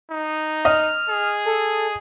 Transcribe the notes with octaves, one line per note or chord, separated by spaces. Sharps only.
D#4
D#5 F6
G#4
A4